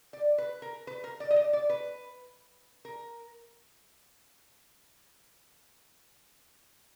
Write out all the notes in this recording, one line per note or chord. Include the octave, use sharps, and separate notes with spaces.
D5
B4
A#4
B4
A#4
D5
D#5
D5
D5
B4
A#4